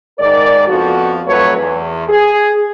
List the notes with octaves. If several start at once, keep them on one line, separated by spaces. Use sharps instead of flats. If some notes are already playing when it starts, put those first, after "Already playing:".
G#2 D#3 A#4 D5
F2 F3 B3 F#4
F2 F#3 A3 B4 C#5
E2
G#4